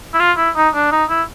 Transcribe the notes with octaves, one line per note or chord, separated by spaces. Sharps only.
E4
F4
E4
D#4
D4
D#4
E4